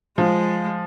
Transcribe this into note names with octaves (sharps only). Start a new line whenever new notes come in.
F3 G#3